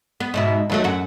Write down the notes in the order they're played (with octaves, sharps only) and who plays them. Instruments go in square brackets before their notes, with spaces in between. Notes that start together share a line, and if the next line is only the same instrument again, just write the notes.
[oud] B3
G#2 B2 E4
D#2 F#3 A3
F#2 F#4